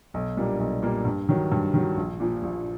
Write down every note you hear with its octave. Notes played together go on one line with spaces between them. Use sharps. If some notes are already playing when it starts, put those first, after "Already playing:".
B1
A#2 G3 A#3 D4
B1
A#2 G3 A#3 D4
G2
D#3 F#3
G2
D#3 F#3
A#1
A#2 F3
A#1